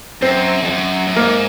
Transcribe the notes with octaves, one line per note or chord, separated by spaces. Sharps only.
F#2 C4 C5
F2
F#2
F#2
G#2 A#3 A#4